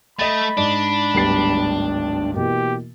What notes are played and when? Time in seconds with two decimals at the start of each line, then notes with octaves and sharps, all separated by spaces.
0.19 A3 D#5 B5 A6
0.57 G#2 D4
1.14 D1 G#1 G3 B3 A6 C7
2.36 B2 E3 A#3 G4